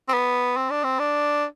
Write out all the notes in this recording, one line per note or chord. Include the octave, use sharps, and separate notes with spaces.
C4
B3
C4
D4
C4
D4